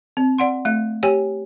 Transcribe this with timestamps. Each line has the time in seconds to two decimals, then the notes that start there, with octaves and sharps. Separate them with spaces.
0.17 C4
0.38 D5 F#5 C6
0.65 A3 E5
1.03 G4 C#5 G5 G#5